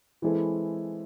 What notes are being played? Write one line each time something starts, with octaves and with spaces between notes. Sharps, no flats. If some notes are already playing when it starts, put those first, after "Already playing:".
E3 G#3 C4 E4 A4